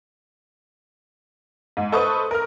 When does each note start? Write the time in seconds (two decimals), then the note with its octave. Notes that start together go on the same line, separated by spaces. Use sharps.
1.77 G#2
1.92 A4 B4 C5 C#6 D#6
2.31 A#4 F6